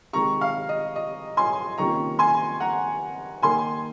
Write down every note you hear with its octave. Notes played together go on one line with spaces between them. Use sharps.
C3 D#3 G#3 A#5 C#6
F5
D#5
D#5
G#5 C6
C3 D#3 A#3 C#4 F4 A#5 C#6
G#5 C6
F#5 A#5
D#3 A#3 D#4 G#5 C6